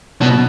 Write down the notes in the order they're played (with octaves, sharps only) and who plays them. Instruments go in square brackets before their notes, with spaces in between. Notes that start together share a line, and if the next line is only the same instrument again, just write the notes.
[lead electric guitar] B2